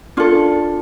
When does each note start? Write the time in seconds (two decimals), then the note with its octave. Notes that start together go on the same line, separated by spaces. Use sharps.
0.17 D4 F4 A4